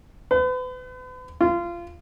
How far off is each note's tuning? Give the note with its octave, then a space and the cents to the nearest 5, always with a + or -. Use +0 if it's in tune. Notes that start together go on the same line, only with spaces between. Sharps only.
B4 +40
F4 -20